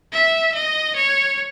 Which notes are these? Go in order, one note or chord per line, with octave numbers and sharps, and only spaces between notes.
E5
D#5
C#5